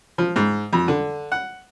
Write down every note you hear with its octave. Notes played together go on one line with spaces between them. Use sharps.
F3
G#2
F2
D3
F#5